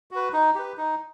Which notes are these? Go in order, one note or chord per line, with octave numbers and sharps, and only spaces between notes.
F#4 B4
D#4
G4 B4
D#4